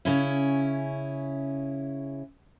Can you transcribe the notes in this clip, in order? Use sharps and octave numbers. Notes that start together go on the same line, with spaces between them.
C#3 C#4 E4